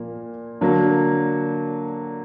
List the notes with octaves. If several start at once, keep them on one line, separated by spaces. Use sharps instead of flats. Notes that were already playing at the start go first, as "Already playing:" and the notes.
Already playing: A#2 F3 A#3
D3 F#3 A#3